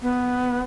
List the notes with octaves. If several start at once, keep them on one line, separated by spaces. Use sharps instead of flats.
B3